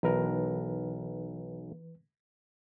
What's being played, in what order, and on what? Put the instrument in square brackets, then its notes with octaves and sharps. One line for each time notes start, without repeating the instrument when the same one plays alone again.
[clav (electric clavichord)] B1 A#4 [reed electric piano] E3 B4